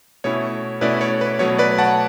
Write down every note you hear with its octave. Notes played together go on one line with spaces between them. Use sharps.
B2 A3 C#4 E4 C#5
B2 A3 C#4 E4 B4 D5
C#5
B4
B2 F#3 A3 C#5
B4 D5
F#5 A5